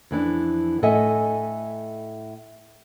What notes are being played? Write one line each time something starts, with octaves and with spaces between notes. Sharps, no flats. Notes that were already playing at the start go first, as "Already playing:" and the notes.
F2 E3 D4
A2 A4 D#5 E5 F#5 G#5